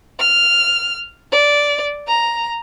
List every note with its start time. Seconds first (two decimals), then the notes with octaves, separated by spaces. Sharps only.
0.19 F6
1.32 D5
2.07 A#5